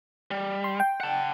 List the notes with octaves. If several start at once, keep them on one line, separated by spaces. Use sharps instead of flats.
G3
C6
G5
F#5 A5